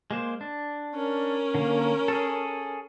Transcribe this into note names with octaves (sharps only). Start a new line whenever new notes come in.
G#3 A#3 C5
D4
C#4 A#4
D3 A#3
G#4 A4